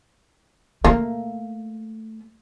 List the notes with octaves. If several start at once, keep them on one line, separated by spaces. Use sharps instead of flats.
A3 A#3